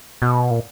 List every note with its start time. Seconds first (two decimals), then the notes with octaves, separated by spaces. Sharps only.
0.22 B2
0.51 A#2